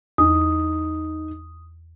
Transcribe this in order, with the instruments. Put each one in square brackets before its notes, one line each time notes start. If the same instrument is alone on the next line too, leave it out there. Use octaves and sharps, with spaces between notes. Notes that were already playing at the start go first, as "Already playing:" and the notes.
[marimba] E2 [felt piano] D#4 [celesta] D#6